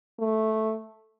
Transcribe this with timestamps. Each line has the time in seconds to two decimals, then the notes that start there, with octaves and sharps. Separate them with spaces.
0.19 A3